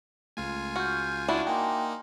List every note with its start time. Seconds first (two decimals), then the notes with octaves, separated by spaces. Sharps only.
0.37 C#2 A3 F4 G#5
0.76 F#4 F6 G6
1.28 D4 E4 F#4
1.47 A#3 D#4 G5 G#5 C6